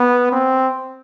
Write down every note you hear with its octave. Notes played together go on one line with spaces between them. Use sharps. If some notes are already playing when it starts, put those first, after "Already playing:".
Already playing: B3
C4